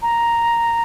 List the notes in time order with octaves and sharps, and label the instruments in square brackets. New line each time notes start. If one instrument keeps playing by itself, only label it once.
[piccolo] A#5